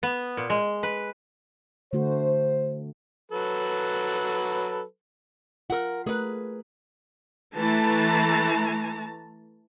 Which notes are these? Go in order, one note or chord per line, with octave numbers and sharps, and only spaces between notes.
B3
A#2
G#3
B4
D3 A3 F#4 C5
F#3 A4 B4
F4 A#4 F#5
A3 G#4 A#4 B4
E3 A3 A5 A#5